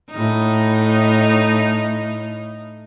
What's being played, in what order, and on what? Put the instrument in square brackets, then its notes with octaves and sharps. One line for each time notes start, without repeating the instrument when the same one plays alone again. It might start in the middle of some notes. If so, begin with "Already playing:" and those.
[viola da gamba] A2 D#4